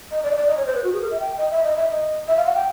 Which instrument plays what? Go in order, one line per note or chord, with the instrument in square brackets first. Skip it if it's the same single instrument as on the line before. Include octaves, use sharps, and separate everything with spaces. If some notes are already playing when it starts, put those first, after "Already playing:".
[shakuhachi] D#5
D5
D#5
D5
D#5
C#5
C5
B4
F#4
G#4
A#4
E5
G5
D#5
E5
D#5
E5
D#5
E5
F5
F#5
G5